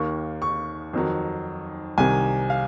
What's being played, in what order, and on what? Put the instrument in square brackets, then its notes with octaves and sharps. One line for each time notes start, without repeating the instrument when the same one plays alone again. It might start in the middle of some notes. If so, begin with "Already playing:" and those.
Already playing: [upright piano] D#2 D#3 A#3 C#6
C#6
F2 D#3 F#3
C2 C3 D#3 G#5
F5